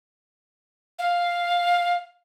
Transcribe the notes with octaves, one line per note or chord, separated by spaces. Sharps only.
F5